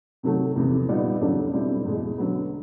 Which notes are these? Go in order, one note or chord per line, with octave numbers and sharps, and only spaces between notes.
C3 D#3 F#3 A3
E2 C3 E3
A#2 G3 B3 D#4
E2 C#3 F#3 A3 D4
B2 G3 C4 E4
E2 B2 G#3
D3 F#3 B3